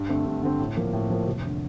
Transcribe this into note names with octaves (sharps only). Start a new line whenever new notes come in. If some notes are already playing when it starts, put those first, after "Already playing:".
Already playing: G2
D3 A3 C4
G2
D3 A3 C4
A2
F3 A#3
A2
F3 A#3
F1
D3